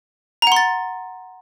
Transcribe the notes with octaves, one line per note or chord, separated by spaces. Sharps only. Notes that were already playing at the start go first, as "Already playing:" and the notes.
F#5 A#5 C6 A6